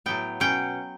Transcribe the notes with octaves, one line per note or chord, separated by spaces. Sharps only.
A2 F#3 B3 G5
B2 F#3 C#4 G5